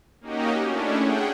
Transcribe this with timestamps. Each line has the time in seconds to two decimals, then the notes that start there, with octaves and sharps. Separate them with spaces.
0.21 A#3 C#4 D#4 F#4 G4 D#5
0.64 A3 C#4 D4 E4
0.97 G#4 F#5 G5